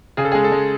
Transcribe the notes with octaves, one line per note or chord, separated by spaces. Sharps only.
C#3 G#4
A4
G#4
G#3
A4
G#3